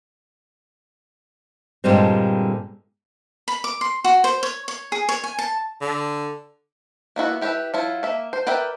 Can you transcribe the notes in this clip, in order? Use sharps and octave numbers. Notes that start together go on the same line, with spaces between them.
G2 A#2 D3 G3 G#3 C4
B5
D6
C6
F#4
C5
C#5
C#5
G#4
C#5
G#5
A5
D3
A#3 B3 E4 F#4
E4 G4 B4 D5 E5
F#3 E4 F4
A#3 E5
C5
A#4 B4 D5 E5 G5